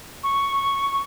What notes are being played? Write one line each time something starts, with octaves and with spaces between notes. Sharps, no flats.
C#6